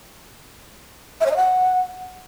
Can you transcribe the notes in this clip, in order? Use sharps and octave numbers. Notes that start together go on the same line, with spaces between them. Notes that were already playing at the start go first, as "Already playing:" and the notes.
E5
C#5
D#5
F#5